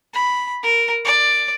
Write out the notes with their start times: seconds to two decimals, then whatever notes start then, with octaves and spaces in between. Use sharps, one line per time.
0.14 B5
0.63 A#4
1.05 D5